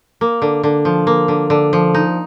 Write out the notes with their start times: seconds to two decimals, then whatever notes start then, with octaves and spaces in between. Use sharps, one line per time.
0.21 A#3
0.42 D3
0.63 D3
0.85 F3
1.07 A#3
1.28 D3
1.50 D3
1.73 F3
1.94 D#4